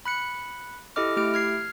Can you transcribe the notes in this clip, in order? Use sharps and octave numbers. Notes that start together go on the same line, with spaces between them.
B5 F#6 C#7
E4 G4 A4 D#5 D6 F6
A3 E4 G4 F6 D7
F6 G#6 C7